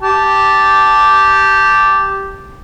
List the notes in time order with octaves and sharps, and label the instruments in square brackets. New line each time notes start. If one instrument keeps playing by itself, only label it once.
[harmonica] G4 A5